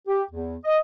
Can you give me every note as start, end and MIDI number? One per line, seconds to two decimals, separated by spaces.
0.08 0.23 67
0.31 0.56 40
0.64 0.78 75